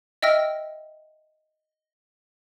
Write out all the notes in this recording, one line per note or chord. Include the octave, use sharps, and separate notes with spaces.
D#5 E5 G5 E6 F6 A#6